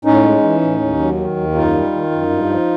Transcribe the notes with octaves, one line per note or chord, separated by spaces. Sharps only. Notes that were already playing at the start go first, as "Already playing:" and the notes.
A2 C#4 D#4
G#3
E3
A2
D#2
F#3
D#3
D#2
F#2 D#4 F4
G3
D#3
F#2
G2
F3